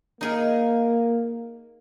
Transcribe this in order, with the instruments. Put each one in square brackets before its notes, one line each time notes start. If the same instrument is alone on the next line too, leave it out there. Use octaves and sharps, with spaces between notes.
[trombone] A#3 [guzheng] D#4 G#4 A#4